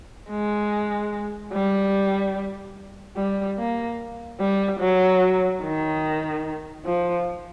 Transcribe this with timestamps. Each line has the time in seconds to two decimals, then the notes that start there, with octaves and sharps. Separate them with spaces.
0.30 G#3
1.53 G3
3.17 G3
3.59 A#3
4.40 G3
4.80 F#3
5.63 D#3
6.86 F3